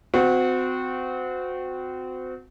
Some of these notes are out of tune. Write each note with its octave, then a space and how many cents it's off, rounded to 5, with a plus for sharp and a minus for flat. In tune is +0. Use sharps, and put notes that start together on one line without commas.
C4 -30 F#4 -20